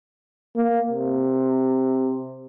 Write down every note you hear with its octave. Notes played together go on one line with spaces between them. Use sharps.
A#3
C3